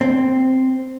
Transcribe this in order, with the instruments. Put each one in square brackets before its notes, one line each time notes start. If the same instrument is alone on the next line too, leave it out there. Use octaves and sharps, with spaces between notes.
[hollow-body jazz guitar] C4